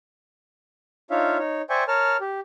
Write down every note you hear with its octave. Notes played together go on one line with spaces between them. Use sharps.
D4 D#4 F4 C#5 E5 F5
D#4 C#5
C5 D5 E5 G5 G#5 C#6
A#4 C#5 A5 F6
G4